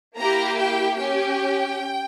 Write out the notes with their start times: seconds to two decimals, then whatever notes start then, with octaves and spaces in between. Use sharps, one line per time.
0.17 A#3 E4 G4 A#5
0.58 G5
0.99 C#4 G4 G5